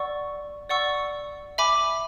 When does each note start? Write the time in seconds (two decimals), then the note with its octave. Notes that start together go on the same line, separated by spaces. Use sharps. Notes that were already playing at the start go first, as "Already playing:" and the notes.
Already playing: D5 F#5 C#6 E6
0.69 D5 F#5 C#6 E6
1.58 E5 G#5 B5 D6